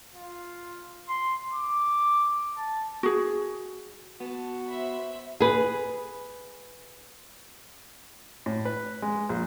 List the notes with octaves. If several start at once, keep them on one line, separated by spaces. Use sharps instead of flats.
F4
C6
D6
A5
F#4 G#4
B3 F#4 A5
C5 E5 B5
G#4 B4
A2
B4
G#3
A#1